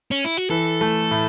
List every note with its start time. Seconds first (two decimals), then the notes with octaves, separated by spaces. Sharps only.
0.11 C#4
0.25 E4
0.37 F#4
0.50 E3 A4
0.81 A3
1.11 A2